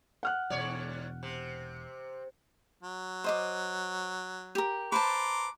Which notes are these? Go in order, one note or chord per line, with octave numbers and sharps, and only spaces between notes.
F#5 F6 F#6
E1 G#2 C#5 D5
C3
F#3
C5 D#5 D6
G4 A#4
B4 C5 A5 A#5 C6 D6